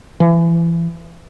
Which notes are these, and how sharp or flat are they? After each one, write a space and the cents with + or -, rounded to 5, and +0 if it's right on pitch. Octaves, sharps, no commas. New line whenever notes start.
E3 +30